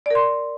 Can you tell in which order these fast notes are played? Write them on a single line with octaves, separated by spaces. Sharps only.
D5 A#4 C6